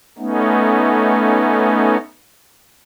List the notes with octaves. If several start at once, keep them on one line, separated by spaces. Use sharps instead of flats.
A3 B3 C#4 D#4